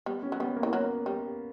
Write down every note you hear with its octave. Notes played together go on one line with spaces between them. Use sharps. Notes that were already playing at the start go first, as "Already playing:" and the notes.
G3 B3
C#4
F#3
G3 B3
A#3
E3
F#3 A#3
G3